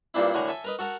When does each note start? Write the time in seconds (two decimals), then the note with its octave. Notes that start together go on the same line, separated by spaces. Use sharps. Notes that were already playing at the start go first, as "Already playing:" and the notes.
0.14 G2 A#2 C4 D4 E4
0.34 A2 D3 F#4 A#4 G#5
0.48 A4 E5 G#5
0.64 A#4 B4 D#5
0.79 F#4 A4 A#4 F#5